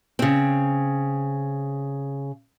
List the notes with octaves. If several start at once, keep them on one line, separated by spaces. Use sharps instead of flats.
C#3 C4